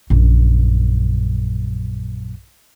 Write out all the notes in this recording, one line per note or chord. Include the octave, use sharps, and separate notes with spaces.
A#1 F#2